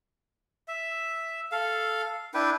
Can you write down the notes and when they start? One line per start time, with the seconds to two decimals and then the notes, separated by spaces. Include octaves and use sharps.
0.68 E5
1.52 A4 F5
2.34 D4 E4 B4 G5